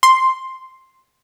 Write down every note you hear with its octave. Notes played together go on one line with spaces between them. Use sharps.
C6